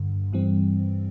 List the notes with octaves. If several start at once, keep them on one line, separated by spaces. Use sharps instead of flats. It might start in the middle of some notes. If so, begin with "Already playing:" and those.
Already playing: G2 D3
G2 E3 G3 C4